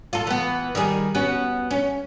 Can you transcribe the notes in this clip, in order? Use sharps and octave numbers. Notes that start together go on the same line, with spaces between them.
F4 A4
E3 B3
D#3 G3 G#4
B3 C#4 F#4
C#4